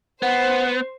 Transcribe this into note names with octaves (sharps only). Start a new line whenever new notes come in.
B3 C5 F#5